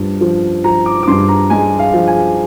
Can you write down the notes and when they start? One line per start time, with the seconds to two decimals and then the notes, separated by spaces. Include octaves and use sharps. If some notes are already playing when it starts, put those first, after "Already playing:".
Already playing: G2 F3
0.21 F3
0.64 F3 A#5
0.86 D6
1.03 D6
1.07 G2 C6
1.29 A#5
1.50 G#3 G#5
1.79 F5
1.94 F3
2.07 G#5